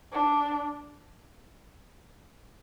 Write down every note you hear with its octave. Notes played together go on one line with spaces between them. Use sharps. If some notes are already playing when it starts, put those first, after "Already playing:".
D4